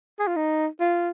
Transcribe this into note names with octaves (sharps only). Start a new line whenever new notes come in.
G#4
F4
D#4
F4